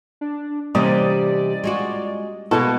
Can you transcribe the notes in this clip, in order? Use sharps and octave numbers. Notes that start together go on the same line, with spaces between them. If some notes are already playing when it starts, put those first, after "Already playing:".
D4
C3 E3 G3 A#3 C#4 D5 D#5
G#3 F4 F#4
B2 G#3 A#3 E4 A4 A5 C#6